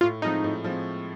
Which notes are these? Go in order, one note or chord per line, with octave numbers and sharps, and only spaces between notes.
A2 F4
F3 G#3 C4 D#4
A2
F3 G#3 C4